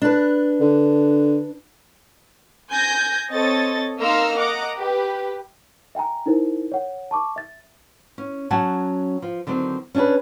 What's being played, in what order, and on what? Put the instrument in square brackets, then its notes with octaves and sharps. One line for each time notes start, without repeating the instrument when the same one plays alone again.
[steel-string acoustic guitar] D4 B4
[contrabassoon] D3
[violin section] G#5 G6 G#6 A#6
C4 A4 C#5 D#5 A6
A#3 D#4 A#5 C6 E6 F6
D#5 F#5 A#5 D6
G4 B4
[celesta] E5 G5 G#5 A#5
D#4 E4 A#4 C5
C#5 F#5
A5 C#6 D6
E5 A6
[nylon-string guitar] C#4
F#3 C#4 F#5 G#5 A5
F3
D3 D#3 F#3 C4
C#4 D4 F#4 G#4 B4